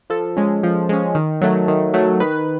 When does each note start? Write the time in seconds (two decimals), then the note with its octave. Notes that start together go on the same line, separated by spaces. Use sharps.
0.10 F3 A4
0.37 G#3 C#4
0.63 F3
0.89 G#3 C#4
1.15 D#3
1.41 F#3 A3
1.68 D#3
1.94 F#3 A3
2.20 D#3 B4